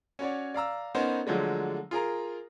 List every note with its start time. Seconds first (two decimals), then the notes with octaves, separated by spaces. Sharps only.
0.19 C#4 F#4 C#5 D5
0.54 D5 F5 A#5 E6
0.95 B3 C#4 D#4 A#4 C5
1.26 D3 F3 F#3 G#3 A3 D4
1.91 F4 G#4 A#4 A#5